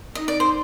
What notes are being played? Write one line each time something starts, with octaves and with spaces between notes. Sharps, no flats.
D#4 D#5
D5
C5